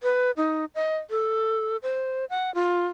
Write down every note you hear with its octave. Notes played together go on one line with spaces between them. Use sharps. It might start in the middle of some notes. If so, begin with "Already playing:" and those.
B4
D#4
D#5
A4
C5
F#5
F4